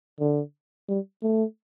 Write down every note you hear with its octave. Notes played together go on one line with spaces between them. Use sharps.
D3
G3
A3